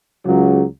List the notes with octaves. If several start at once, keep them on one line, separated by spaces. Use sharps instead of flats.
C#2 C#3 F#3